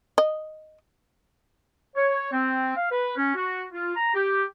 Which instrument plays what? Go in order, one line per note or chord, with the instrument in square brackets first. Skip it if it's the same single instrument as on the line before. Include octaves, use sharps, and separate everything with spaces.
[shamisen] D#5
[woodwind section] C#5
C4
F5
B4
C#4
F#4
F4
A#5
G4